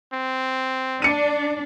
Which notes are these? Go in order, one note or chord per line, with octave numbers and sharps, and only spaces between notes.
C4
D4 C#7 D#7